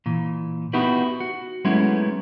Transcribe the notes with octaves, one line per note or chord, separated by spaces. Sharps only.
A#2 E3
B3 D#4 E4 F#4 G4 B4
F#4
F#3 G#3 A3 B3 C#4 E4